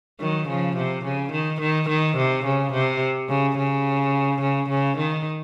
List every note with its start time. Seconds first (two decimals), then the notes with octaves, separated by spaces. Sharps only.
0.20 D#3 F#3
0.48 C#3 F3
0.76 C3
1.04 C#3
1.32 D#3
1.61 D#3
1.89 D#3
2.17 C3
2.45 C#3
2.72 C3
3.29 C#3
3.57 C#3
4.41 C#3
4.70 C#3
4.97 D#3